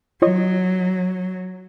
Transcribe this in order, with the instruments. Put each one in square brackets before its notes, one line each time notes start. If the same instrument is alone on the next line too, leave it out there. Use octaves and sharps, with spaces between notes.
[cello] F#3 [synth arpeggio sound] F4 C#5 D#5